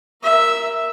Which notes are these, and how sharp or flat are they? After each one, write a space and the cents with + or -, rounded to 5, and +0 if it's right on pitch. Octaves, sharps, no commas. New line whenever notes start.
A#4 +0 E5 +0